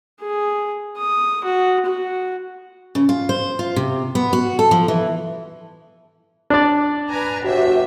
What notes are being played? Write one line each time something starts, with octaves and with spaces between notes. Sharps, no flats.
G#4
D#6
F#4
F#4
C#3
F4
C5
F4
C3
B3
F#4
A4
F3
E3
D4 D5
B4 G#5 A#5
G1 F#4 G4 E5